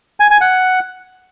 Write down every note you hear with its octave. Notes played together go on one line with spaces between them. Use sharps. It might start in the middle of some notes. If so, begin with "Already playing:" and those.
G#5
G#5
F#5